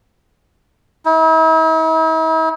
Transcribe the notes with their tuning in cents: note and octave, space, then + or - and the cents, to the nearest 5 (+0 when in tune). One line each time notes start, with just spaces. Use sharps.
E4 -45